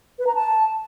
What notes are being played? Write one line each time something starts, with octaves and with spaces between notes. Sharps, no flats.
B4
A#5
A5